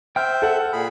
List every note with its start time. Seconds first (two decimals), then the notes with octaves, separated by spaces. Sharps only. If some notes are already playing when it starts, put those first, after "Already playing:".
0.16 C5 E5 G5 F6 G6
0.42 A4 F#5
0.73 A#2 G#4 B5